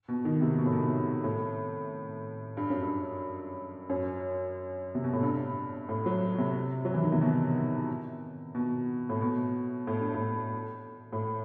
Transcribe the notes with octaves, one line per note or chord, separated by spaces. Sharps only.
B2
D#3
C3
B2
A2
B2
A2
G2
F#2
G2
F#2
C3
B2
A2
G2
A2
F#3
C3
F#3
E3
D#3
C3
B2
B2
A2
B2
A2
G2
A2
A2